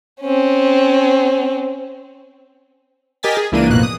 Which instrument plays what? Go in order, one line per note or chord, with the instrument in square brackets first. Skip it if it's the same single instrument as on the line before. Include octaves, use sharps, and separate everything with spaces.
[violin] C4 C#4
[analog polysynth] G4 A#4 D#5 G#5 A6 B6
G#4
C#2 E3 A#3 D4 D#7
A1 F2 B2 A#3 F#6
D#6